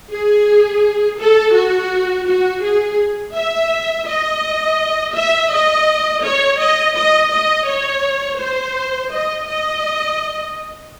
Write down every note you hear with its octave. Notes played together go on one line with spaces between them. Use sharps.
G#4
A4
F#4
F#4
G#4
E5
D#5
E5
D#5
C#5
D#5
D#5
D#5
C#5
C5
D#5
D#5